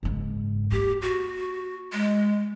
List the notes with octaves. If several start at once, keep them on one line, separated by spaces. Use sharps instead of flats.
F#1 G#2
A#3 G4
F#4
G#3